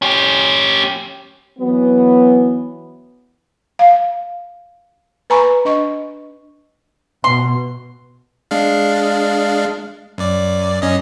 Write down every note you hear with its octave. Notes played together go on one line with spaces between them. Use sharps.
C#4 G4
E3 F#3 B3
F5
B4 G#5 A#5 B5 C#6
D4 D#5 C#6
B2 C6
G#3 D4 F5
F#2 D5
F#2 C#4 D#5